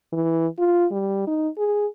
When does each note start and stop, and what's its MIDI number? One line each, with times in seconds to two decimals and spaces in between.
0.13 0.47 52
0.58 0.86 65
0.91 1.26 55
1.27 1.49 63
1.58 1.86 68